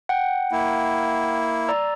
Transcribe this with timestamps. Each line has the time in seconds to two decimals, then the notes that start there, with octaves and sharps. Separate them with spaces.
0.09 F#5 G5
0.52 A#3 E4
1.68 D5 A#5 E6